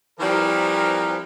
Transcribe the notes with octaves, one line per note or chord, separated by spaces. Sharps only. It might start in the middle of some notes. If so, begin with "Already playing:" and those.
E3 F3 G3 C4 A#4